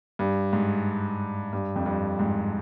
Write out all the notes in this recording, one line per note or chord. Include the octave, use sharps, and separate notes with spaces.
G2
G#2
G2
F2
G2
G#2